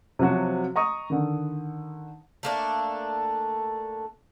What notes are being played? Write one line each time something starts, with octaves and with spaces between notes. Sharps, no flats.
C3 F3 F#3 F#4
D#5 A#5 C#6 D#6
D3 D#3
A3 A#3 D4